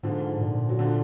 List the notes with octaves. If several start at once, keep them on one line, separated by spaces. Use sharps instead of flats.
G#2 D3 F3
A#2
F#3
D3 F3